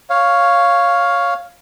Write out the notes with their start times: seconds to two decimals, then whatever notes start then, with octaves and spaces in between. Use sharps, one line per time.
0.10 C#5 F5